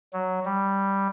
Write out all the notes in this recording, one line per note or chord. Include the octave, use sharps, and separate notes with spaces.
F#3
G3